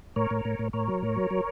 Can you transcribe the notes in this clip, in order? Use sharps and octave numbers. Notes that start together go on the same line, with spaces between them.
A2 A#4 C#5
A2
A2
A2
A2 A#4 C#5
F#3
A2
F#3
F#3